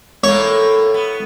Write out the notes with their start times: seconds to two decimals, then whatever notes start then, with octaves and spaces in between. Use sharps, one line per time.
0.24 A2 A3 A#3 C#5
0.94 B3